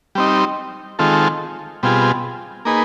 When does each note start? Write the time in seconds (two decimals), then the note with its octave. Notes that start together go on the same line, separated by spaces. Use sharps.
0.15 G3 C4 D#4
0.99 D#3 G#3 C4 F4 A4
1.83 B2 G3 C4 F4 G#4
2.65 A#3 D#4 G#4 B4